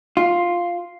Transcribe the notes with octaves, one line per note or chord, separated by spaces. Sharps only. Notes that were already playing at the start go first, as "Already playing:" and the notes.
F4